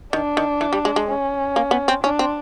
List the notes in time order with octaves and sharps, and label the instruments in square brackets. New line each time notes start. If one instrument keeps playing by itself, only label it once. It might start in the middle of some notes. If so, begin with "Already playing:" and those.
[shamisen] D#3 [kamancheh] D4
[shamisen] D#3
E3
G3
G#3
G#3
[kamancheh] C#4
[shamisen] A#3
B3
C4
[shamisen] C#4 [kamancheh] D4
[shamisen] C4